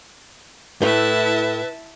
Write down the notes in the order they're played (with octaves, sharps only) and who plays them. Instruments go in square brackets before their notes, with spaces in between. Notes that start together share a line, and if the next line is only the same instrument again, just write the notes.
[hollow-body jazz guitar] A2 A3 [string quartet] E4 E5 A5 [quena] B4